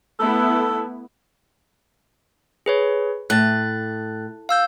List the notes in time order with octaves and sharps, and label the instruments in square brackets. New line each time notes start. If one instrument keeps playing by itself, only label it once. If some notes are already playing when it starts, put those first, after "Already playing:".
[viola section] A3 B3 E4 [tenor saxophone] A4
[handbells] G#4 B4 C#5
[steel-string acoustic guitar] A2 [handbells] F#6 A6
[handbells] F5 E6 G6